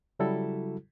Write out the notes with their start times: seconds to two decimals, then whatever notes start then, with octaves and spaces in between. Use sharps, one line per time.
0.19 C#3 F#3 G3 E4 F#4 A4